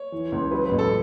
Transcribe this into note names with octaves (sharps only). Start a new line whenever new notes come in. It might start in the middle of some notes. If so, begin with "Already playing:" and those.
Already playing: C#5
E3
C#2
F#3 B4
B4
A1
A4